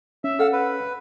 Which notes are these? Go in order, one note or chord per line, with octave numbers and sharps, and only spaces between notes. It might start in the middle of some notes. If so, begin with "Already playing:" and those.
C#4 E5
A4 F5 F#5 E6
B4